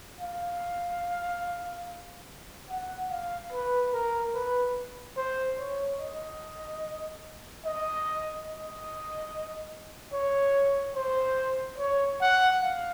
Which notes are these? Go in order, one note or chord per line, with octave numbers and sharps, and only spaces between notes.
F5
F#5
F5
B4
A#4
B4
C5
C#5
D#5
D#5
D#5
C#5
C5
C#5
F#5
F5